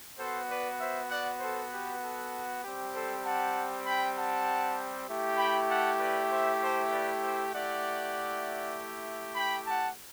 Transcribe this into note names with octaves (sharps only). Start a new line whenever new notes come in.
B3 F#4 A4 C5
B4 D5
C5 E5
D5 F#5
A4 C5
G4 B4
A4
G3 C4 G4
A4 C5
F#5 A5
G5 B5
F#5 A5
A3 E4 G4
G5 B5
F#5 A5
B4 D5
C5 E5
A4 C5
B4 D5
C5 E5
A3 E4 G4 D5 F#5
G5 B5
F#5 A5